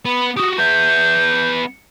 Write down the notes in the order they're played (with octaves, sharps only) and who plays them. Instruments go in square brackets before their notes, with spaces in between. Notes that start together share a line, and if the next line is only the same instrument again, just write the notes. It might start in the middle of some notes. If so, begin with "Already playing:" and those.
[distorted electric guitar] B3 [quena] B5
[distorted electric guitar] F#4 G4 [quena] D#6
[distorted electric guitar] B3 E5 [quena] G6